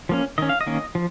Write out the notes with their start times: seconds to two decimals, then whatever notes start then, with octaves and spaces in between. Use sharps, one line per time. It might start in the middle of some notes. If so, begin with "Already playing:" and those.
0.09 F3 A#3 C#4
0.38 D#3 C#4 D#5
0.49 F5
0.61 D#5
0.67 D#3 A#3 C#4
0.95 F3